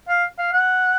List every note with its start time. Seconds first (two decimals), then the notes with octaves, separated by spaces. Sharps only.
0.09 F5
0.38 F5
0.53 F#5